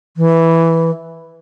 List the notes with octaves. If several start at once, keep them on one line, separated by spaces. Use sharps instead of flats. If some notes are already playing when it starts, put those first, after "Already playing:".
E3